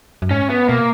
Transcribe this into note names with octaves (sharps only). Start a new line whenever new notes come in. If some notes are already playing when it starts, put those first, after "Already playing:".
F#2
G#2 C#4
B3
B2 A#3